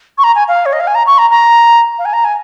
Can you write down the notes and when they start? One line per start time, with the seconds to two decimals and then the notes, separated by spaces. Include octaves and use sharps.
0.18 C#6
0.24 A#5
0.35 G#5
0.48 F5
0.66 C#5
0.73 D#5
0.80 F5
0.87 G#5
0.95 A#5
1.07 C#6
1.18 A#5
1.31 A#5
1.99 F5
2.05 G#5
2.13 A#5
2.24 G#5